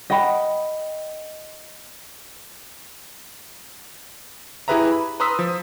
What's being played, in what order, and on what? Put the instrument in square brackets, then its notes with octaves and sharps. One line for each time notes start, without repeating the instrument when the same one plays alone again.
[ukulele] D#5 F#5 G5 B5
[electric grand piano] E4 G4 G#4 B4 E5 A#5
B5
B4 A#5 C6 D#6 E6 B6
F3